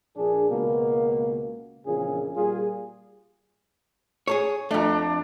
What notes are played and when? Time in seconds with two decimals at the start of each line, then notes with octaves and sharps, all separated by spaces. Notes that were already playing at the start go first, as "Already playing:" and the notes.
0.17 A#1 D4 G#4
0.49 C#2 B2 A#3
1.86 A#1 E2 A#2 C#3 C#4 G#4
2.36 A#2 G3 F4 G#4
4.28 G#4 A4 C#5
4.71 F2 A3 D4 A#5